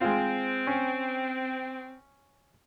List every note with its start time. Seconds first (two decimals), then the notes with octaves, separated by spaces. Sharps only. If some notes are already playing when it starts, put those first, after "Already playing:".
0.01 G#3 C4 F4
0.67 C#4